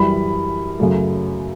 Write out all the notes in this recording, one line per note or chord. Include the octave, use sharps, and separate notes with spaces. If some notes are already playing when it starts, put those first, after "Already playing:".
Already playing: F#2 E3 G3 B5
F#2 C#3 F#3 A3